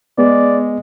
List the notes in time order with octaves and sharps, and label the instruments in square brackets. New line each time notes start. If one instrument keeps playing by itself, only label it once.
[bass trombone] G#3 [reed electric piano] B3 [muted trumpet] D5